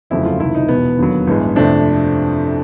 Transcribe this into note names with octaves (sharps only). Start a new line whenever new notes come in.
G1 F2 C#3 F#3 A3 E4
F4
C#2 C3 D#3 E4
D#4
E1 E2 B2 B3
D#2 D3 F#3
A1 G2 E3 G#3
F2 C3 F3 A3 D4